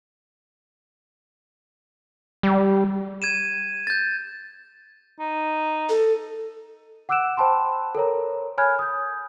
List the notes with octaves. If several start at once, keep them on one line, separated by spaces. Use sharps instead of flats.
G3
G#6 D#7 E7
G6 A6
D#4
A4
F#5 D6 E6 F#6 D7 E7
C5 G5 A5 B5 C6
A4 A#4 C#5 A#5
C#5 G#5 B5 F6 F#6 G#6
D#6 G6